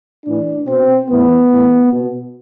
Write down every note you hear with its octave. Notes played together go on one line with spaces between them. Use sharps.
A2 E3 D4
B2 C4
A2 E3 B3
A2 E3
B2